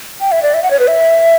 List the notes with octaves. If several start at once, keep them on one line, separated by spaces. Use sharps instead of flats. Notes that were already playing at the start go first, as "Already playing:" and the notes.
G5
E5
D5
E5
F#5
C#5
B4
E5